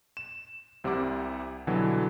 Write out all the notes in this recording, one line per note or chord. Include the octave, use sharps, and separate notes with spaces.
E7
C2 C3 G3 F#5 D6
B2 D3 E3 F#3 G3